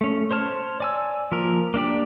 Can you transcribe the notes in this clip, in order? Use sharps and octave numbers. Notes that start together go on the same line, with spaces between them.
A3 C#4
C5 C#5 A5 F6
D5 G#5 E6
F3 A#3 A#4
A#3 D4 G4 D5